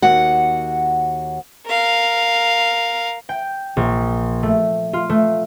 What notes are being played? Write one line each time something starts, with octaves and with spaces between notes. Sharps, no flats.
D#2 F#4 F#5
A#4 F5
G5
A#1
A3
F4
A3